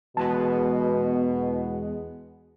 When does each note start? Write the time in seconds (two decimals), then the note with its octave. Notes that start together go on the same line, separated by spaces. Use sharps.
0.17 E2 B2 G#3 B3 A5